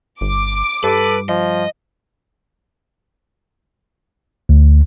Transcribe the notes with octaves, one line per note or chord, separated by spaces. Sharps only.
G1 D6
G2 A4 B4
F3 D#5
D2